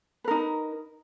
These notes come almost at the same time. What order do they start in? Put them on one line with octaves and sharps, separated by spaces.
B4 A#4 D#4